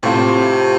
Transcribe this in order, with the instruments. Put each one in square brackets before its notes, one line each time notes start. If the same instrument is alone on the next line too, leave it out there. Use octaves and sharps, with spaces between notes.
[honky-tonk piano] A2 A3 C4 F4 C5 [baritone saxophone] C3